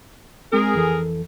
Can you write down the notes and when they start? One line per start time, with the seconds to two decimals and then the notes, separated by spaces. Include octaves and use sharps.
0.53 G#3 C4 G#4 A#4
0.74 F2 E3 A4